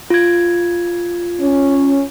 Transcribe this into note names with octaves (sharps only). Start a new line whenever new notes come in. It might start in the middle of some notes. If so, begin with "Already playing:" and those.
F4 G#6
C#4